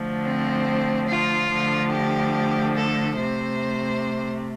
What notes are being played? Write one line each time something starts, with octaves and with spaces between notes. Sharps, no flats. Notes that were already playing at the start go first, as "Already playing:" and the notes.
Already playing: D3 F3 A3
C4
F4
D3 F3 A3
G4
A4
C3 A3 C5